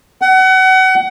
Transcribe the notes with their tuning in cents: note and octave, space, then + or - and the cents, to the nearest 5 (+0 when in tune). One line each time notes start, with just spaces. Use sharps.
F#5 +30